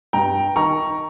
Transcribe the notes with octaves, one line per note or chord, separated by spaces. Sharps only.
G2 G5 A#5
D#3 A#5 C#6